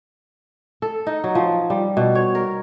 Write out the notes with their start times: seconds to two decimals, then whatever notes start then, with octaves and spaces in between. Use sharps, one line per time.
0.82 A4
1.07 D#4
1.24 F#3
1.35 F3
1.70 G3
1.97 B2
2.15 C#5
2.35 A#4